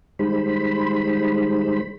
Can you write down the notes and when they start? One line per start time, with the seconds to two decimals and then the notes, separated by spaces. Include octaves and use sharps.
0.19 D#3 G3 G#3 C5 B5